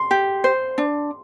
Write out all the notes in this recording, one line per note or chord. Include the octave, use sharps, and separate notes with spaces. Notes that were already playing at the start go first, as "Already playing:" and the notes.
Already playing: C6
G4
C5
D4